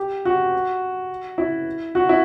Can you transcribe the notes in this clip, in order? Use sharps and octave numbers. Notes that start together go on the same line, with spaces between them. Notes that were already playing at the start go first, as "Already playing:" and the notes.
Already playing: G4
F#4
E4
F#4
E4